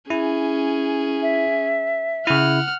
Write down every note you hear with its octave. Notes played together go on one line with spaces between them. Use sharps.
C#4 E4 G#4
E5
C#3 E4 F#5 F6